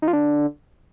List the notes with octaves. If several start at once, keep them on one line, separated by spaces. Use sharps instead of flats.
D#3
F3
D3